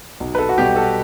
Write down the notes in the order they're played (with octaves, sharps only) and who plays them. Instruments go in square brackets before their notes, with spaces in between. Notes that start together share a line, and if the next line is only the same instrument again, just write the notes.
[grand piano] B1
B4
A4
F#4
B2 G3 G4
A4